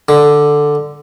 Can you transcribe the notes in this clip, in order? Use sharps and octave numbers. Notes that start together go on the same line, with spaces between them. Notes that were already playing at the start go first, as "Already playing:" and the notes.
D3